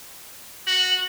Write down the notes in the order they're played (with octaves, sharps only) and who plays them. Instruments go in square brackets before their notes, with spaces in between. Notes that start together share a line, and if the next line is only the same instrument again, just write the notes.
[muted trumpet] F#4 [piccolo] F#7